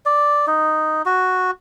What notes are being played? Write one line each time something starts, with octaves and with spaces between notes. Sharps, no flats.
D5
D#4
F#4